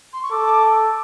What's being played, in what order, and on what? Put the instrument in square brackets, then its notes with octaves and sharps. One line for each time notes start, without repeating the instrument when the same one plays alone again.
[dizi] C6
C#6
[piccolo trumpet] A4 [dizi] D6